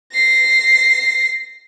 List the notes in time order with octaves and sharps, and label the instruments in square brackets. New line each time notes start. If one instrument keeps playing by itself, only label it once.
[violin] A#6 C7